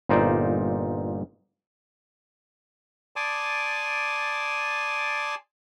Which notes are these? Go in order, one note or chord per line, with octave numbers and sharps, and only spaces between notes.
G1 A#2 D#4 C5 D5
D5 G#5 A5 C6 D6 D#6